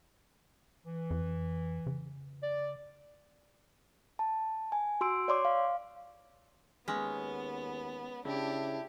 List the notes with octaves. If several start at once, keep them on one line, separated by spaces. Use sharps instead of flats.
E3
F2
C#3
D5
A5
G#5
F#4 C6 E6 D7
C#5 D5 C6 D6
F5
D#2 G#3 B3 C#4
C#3 D4 E4 G4